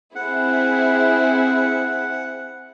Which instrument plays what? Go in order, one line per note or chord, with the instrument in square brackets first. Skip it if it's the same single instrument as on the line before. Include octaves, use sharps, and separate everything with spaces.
[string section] C4 E4 G#4 [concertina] F#5